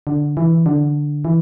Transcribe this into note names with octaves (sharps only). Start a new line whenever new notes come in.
D3
E3
D3
E3